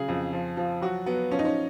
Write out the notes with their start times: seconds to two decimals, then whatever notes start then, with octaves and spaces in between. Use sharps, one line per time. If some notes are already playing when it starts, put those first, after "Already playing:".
Already playing: C#3 F#3 G#4
0.08 F2
0.33 F3
0.57 F3
0.81 F#3 F#4
1.06 F#3 B3
1.31 F3 C#4
1.39 D#4
1.45 C#4